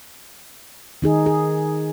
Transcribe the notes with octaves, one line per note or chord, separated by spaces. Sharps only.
D#3 D#4 G#4
G#4